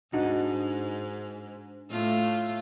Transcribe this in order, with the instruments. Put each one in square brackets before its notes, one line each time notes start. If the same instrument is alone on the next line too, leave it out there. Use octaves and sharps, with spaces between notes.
[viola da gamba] G#2 [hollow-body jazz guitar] D4 D#4 F#4
[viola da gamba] A2 A3 F4